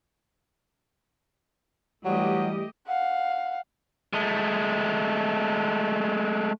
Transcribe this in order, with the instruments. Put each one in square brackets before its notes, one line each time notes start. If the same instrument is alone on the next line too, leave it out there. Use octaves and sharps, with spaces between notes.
[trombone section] E3 G3 [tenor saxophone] F#3 [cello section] A3 G4 D#5
[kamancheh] F5 F#5
[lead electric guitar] G#3 A3